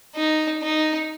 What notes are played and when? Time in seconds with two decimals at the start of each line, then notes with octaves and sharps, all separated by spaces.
0.16 D#4
0.62 D#4